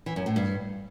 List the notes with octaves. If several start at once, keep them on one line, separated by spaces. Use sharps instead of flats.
E3
F#2
A2
G2